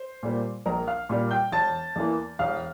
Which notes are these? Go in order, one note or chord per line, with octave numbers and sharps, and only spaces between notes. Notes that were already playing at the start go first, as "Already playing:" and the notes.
Already playing: C5
A#2 G3 A#3
A#1 A#4 A#5
F5 F6
A#2 G3 A#3
G5 G6
E1 A5 A6
E2 E3 A#3
E1 F5 F6